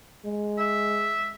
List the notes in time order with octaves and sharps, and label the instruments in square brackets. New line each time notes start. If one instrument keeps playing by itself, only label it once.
[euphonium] G#3
[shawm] E5